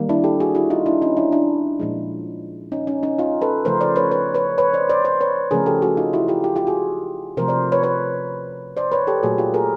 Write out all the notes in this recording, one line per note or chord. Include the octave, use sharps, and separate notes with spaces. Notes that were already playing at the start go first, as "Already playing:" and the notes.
Already playing: D#3 G3 A#3
D4 E4
G4 A4
F#4 G#4
E4 F#4
D#4 F4
D4 E4
C#4 D#4
D4 E4
D4 E4
A#2 F3 G#3
C#4 D#4
C#4 D#4
C#4 D#4
D#4 F4
A4 B4
C#3 F3 A3 A#4 C5
C5 D5
B4 C#5
B4 C#5
B4 C#5
B4 C#5
C5 D5
C5 D5
C5 D5
B4 C#5
C#3 F3 A3 G#4 A#4
G4 A4
F#4 G#4
D#4 F4
E4 F#4
F4 G4
F4 G4
F4 G4
F#4 G#4
C3 F3 A3 A#4 C5
C5 D5
B4 C#5
B4 C#5
C5 D5
B4 C#5
G4 A4
A#2 F#3 A3 F#4 G#4
F4 G4
G#4 A#4